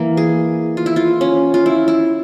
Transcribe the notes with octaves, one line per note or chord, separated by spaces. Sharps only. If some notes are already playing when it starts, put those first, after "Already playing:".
Already playing: E3 A#3
G#4
F4
E4
F4
C#4
F4
E4
E4